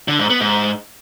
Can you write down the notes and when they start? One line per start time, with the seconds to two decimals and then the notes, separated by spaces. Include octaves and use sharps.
0.08 D3
0.19 G#2
0.30 B3
0.41 G#2